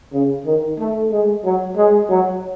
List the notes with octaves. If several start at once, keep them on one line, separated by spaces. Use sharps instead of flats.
C#3
D#3
A3
G#3
F#3
G#3
F#3